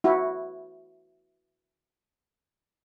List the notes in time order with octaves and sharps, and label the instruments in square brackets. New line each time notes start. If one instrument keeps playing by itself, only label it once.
[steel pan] E4 F#4